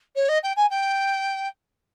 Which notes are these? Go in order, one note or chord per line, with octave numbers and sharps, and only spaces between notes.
C#5
D#5
G5
G#5
G5